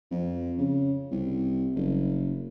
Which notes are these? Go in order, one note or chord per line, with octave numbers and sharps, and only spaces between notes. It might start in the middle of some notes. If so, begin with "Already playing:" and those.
F2
C#3
C2
F#1